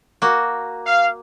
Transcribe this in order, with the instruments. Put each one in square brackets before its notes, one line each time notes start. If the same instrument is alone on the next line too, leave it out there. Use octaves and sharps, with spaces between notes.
[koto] A#3 F#4
[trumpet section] F5